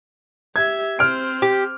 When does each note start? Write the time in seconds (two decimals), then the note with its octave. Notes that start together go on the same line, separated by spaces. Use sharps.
0.56 G4 E5 G#6
0.99 C4 C5 F6 D7
1.42 G4